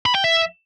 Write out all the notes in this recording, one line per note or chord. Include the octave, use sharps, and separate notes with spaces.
B5
G5
E5